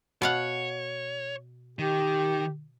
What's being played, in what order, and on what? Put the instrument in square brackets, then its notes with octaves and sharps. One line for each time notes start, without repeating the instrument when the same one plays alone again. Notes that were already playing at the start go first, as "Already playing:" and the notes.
[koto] B2 F5 F#5 [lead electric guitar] C#5
[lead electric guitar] D#3 [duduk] G4